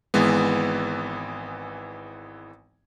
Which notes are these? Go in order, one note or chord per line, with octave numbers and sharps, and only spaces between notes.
G#1 E3 G#3 B3